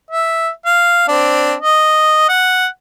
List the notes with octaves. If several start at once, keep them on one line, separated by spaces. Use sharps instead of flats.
E5
F5
C4 D4
D#5
F#5